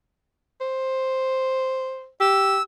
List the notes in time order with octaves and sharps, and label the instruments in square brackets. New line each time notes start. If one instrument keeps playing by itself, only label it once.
[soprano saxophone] C5
[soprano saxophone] G4 [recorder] E6